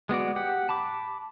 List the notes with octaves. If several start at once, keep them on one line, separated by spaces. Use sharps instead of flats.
G#3 B3 F#4 D5
G4 F#5
A5 B5 D6